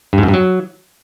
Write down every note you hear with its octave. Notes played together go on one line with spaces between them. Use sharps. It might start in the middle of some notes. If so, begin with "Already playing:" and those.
G2
G#2
F#2
G2
F#3